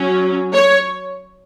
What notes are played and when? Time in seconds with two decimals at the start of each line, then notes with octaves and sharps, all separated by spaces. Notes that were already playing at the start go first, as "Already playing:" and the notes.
Already playing: F#3 C#4
0.53 C#5